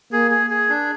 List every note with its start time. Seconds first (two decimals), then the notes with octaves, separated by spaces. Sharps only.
0.12 A#3 G#4
0.31 G#4
0.50 G#4
0.69 D4